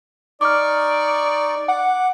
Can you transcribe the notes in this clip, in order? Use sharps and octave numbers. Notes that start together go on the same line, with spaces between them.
D#4 D5 C#6 D6 F6
F#5 D6